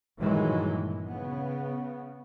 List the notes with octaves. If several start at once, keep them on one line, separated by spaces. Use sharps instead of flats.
G2 A#2 D#3 E3 F#3 G#3
C#3 B3